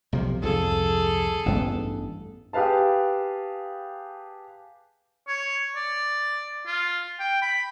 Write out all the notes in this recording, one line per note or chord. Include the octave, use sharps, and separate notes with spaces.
B1 C3 F3
C2 F2 G#2 G#4 A4
A1 G2 B3
G4 G#4 B4 F5 A5
C#5
D5
F4
G5
B5